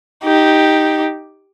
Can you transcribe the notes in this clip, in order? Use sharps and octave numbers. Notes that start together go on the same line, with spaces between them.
D#4 G4